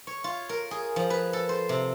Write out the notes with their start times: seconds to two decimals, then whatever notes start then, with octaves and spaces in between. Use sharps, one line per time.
0.07 C#5
0.24 F4
0.49 A#4
0.71 G#4
0.96 F3
1.10 B4
1.33 A4
1.49 C5
1.69 C3